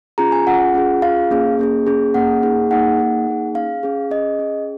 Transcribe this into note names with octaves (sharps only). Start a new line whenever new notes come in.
C#4 F4 G#4 A#5
G#5
C#4 F4 G#4 F#5
C#4 F4 G#4
C#4 F4 G#4 F5
A#3 C#4 G#4
A#3 C#4 G#4
A#3 C#4 G#4
A#3 C#4 G#4 F#5
A#3 D#4 G#4
A#3 D#4 G#4 F#5
A#3 D#4 G#4
A#3 D#4 G#4
C#4 G#4 F5
C#4 G#4
C#4 G#4 D#5
C#4 G#4